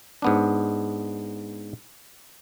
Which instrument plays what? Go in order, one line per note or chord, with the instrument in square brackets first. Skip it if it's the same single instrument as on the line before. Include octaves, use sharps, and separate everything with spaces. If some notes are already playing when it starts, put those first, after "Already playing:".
[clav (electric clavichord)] G#2 B3 D4